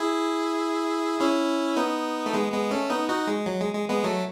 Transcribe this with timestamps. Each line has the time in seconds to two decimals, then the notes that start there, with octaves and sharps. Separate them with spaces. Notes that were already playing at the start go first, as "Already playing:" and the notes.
Already playing: E4 G#4
1.21 C#4 E4
1.76 B3 D#4
2.26 A3
2.33 G#3 B3
2.52 G#3 B3
2.71 A3 C#4
2.90 B3 D#4
3.09 D#4 F#4
3.27 G#3
3.46 F#3
3.60 G#3
3.75 G#3
3.89 G#3 B3
4.04 F#3 A3